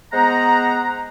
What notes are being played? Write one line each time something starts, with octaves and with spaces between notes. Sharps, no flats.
G#3 B3 C5 F#5 A#5